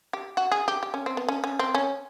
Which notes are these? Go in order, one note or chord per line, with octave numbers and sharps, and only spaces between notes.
G4
F#4
G#4
G4
G4
C#4
C4
B3
C#4
C#4
C4
C#4